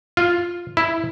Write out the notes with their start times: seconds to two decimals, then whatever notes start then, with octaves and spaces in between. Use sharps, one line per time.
0.17 F4
0.77 E4